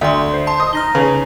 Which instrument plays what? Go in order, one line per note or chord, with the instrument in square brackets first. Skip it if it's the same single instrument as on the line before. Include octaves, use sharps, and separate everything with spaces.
[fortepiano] D2 [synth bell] E5 C6
[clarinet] C5
[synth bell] A5 C6
[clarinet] D#5 [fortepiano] D#6
[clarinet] D#4 [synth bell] F6 A#6 G7
[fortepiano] C#3 [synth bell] B4